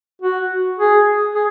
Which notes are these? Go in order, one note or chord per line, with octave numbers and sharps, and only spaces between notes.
F#4
G#4
G#4